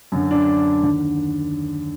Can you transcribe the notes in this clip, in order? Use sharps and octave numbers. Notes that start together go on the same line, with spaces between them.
F#2 D3
D4
D#2 D3